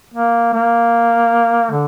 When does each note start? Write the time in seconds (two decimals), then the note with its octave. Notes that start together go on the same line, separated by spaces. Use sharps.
0.14 A#3
0.54 A#3
1.71 D3